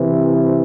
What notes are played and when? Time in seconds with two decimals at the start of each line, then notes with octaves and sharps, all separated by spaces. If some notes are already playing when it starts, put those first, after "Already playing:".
Already playing: C3 E3